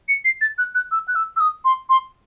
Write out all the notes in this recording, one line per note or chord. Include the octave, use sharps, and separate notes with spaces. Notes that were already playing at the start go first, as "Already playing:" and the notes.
C#7
C7
A6
F#6
F#6
E6
F#6
E6
E6
D#6
C6
C6